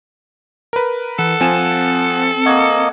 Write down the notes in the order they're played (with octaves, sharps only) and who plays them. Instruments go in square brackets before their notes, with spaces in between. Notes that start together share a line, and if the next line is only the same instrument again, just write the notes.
[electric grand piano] A#4 B4
[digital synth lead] E3 [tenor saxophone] A4 [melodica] F#5
[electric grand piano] F3 G#5 E7 [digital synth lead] C4
[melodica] A#3 D#5 [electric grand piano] F#5 C#6 G#6